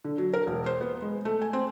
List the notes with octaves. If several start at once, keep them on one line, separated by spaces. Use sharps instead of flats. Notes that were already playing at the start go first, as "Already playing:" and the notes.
D3
F#3
A#4
E1
C5
B3
G#3
A3
G#5
C4